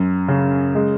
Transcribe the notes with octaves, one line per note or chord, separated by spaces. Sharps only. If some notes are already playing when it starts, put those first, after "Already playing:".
Already playing: F#2
C#3
G#3